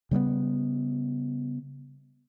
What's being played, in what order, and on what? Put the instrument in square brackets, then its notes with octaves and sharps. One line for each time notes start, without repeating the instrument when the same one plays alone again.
[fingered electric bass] C#3 G3 A#3 B3